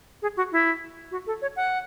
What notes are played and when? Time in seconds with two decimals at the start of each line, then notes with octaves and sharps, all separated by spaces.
0.22 G#4
0.37 F#4
0.52 E4
1.11 F#4
1.27 A4
1.42 C#5
1.56 F#5